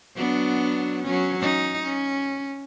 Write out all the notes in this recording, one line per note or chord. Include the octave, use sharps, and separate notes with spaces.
F#3 B3 D4
F#3 C#4
C#4 D#4
C#4